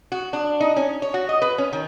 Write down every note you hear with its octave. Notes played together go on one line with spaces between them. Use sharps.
F#4
D4
D#4
C#4
C#5
F#4
D#5
B4
C#4
D#3